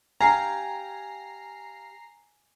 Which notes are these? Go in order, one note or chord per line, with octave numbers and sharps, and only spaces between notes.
G4 F5 G#5 A#5 C7